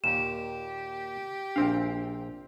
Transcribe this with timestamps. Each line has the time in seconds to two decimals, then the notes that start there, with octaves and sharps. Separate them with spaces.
0.04 D#2 A#2 G4 E7
1.56 A#1 C4 D4 F5